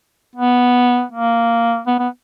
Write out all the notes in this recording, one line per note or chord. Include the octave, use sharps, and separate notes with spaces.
B3
A#3
B3
B3